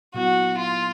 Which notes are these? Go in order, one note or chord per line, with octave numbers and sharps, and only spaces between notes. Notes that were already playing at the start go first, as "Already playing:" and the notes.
A#2 F#3 B3 E4 F#4
F4